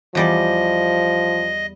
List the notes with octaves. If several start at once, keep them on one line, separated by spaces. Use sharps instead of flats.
E2 F3 G3 D5 D#5